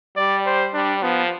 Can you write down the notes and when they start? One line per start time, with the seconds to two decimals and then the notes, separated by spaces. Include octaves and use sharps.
0.16 G3 D5
0.46 C5
0.74 G3 D4
1.02 F3 B3